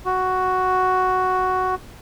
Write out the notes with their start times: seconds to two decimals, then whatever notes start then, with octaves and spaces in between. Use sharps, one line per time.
0.05 F#4